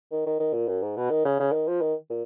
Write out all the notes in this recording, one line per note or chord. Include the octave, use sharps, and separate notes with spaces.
D#3
D#3
D#3
A#2
F#2
G#2
B2
D#3
C#3
C#3
D#3
F3
D#3
A#2